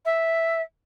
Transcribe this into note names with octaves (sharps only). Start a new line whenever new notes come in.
E5